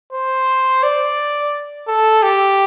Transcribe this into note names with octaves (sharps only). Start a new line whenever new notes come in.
C5
D5
A4
G4